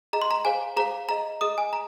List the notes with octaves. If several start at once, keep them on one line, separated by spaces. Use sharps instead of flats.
G#4 D#5 A#5
C6
A#5
G#4 C5 F5 G#5
G#4 C5 F5 A#5
G#4 D#5 A#5
G#4 D#5 D#6
G#5
A#5